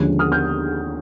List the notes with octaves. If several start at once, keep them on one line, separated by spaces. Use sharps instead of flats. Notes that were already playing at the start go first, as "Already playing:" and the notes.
Already playing: D#2 D3 F3 G#3 C#4
D#6 F6
F6 G6